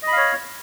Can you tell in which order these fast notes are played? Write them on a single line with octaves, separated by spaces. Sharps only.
D#5 B5 F5 C#5